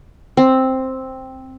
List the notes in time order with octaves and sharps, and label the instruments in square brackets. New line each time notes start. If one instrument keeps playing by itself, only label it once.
[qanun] C4